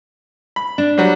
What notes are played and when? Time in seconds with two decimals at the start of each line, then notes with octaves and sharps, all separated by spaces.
0.56 B5
0.78 D4
0.98 F#3 G3